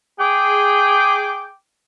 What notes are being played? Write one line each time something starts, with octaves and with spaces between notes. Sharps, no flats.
G#4 G5 D6